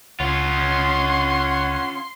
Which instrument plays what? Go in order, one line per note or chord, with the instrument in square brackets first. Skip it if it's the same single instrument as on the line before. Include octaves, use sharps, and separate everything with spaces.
[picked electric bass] C#2 [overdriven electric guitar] C#4 F4 [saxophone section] C#5 F#5 [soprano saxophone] C6